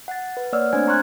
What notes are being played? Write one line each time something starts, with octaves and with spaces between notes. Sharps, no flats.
F#5 A6
B4
A#3 C#5 D5 F#5 E6 F6
A3 C4 D4 C5 G#5 G#6
A#5 C6 C#6 F6 F#6 G#6